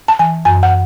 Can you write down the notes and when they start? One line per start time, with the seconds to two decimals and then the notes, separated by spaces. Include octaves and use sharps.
0.08 A5
0.19 E3 G#5
0.45 F#2 G#5
0.63 F#5